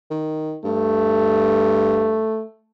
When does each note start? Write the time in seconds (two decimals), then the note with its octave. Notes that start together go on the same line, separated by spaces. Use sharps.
0.11 D#3
0.64 G2 A3